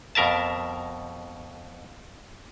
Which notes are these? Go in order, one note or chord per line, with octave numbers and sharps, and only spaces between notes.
F2 B2 A#4 E5 A5